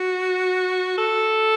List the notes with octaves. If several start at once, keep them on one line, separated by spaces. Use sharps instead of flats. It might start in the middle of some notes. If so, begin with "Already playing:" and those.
Already playing: F#4
A4